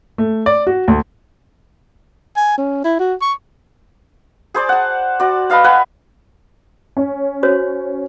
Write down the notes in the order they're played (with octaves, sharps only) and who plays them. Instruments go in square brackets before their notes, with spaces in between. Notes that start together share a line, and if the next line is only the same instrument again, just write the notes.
[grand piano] A3
D5
F#4
D2
[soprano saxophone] G#5
C#4
E4
F#4
C#6
[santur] G#4 C5 D5
F#5 A5
F#4 D5
B4 D#5 F5 A5
B4 F#5 G#5
[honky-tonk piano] C#4
[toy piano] F#4 C5 C#5